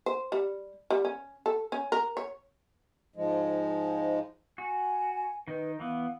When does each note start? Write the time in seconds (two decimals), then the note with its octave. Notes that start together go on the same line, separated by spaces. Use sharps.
0.06 C5
0.32 G3
0.90 G3
1.05 C#4
1.46 A4
1.72 C#4
1.92 A#4
2.17 C#5
3.16 G#2 F3 G#3
4.58 F#4 G#5
5.47 D#3 D#4 B4
5.80 E3 B3 F5